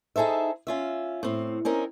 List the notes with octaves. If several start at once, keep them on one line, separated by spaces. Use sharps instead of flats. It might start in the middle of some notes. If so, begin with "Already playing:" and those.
D#4 G#4 A4 C5 E5
C#4 F4 E5
A2 C4
C4 C#4 D#4 A#4